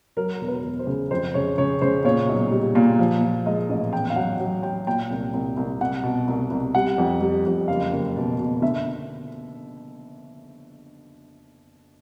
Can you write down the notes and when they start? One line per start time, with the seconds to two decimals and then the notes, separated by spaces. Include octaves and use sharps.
0.17 F#3 A#4
0.41 E1
0.48 B4
0.64 E1
0.79 C5
0.87 C#3
1.11 F2 C5
1.34 C#3 C#5
1.58 C#3 C#5
1.81 C#3 C5
2.04 A#2 C#5
2.29 B1
2.51 G3
2.75 A#2
2.99 F3
3.23 F3
3.46 G#3 D#5
3.69 A1
3.93 E2 G5
4.10 F5
4.16 F#3 F#5
4.40 F#3
4.63 F#3 G5
4.87 A#2 G5
5.10 C2
5.33 C2
5.57 C2
5.81 C2 F#5
6.03 B2
6.27 C2
6.51 C2
6.75 G3 F#5
6.98 F2
7.21 G3
7.46 F2
7.68 F#1 F5
7.92 F#1
8.16 B2
8.39 B2
8.62 D3 E5